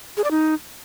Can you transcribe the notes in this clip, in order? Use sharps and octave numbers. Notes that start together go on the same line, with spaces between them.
G#4
D5
D#4